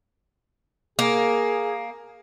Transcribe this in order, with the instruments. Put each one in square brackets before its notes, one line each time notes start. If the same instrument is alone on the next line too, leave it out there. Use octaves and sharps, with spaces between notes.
[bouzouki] A#3 [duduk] G#4